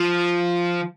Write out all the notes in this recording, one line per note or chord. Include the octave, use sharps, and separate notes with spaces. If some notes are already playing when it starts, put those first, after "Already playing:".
Already playing: F3